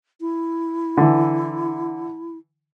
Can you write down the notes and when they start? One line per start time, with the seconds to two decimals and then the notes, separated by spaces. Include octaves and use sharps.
0.21 E4
0.97 D3 E3